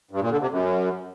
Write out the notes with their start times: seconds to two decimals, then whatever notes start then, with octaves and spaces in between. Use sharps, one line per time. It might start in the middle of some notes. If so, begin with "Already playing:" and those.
0.11 G2
0.21 A#2
0.31 D3
0.41 C3
0.50 F#2